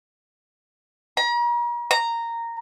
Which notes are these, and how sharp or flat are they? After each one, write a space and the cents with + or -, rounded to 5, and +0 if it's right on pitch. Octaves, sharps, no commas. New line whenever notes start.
A#5 +40
A#5 -10